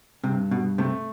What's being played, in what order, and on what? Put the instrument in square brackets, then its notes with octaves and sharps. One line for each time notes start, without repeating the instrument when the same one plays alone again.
[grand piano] G2 [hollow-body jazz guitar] C3
[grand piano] G2 [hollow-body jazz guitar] B2
[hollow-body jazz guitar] C3 [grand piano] A3